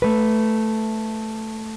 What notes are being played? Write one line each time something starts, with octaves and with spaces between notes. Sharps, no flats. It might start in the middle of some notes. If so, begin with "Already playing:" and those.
A3 B4